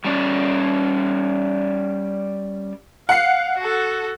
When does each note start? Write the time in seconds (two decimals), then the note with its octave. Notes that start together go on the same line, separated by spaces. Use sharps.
0.04 G3 C#4 D5
3.09 F5 F#5 C7
3.58 F#4 A4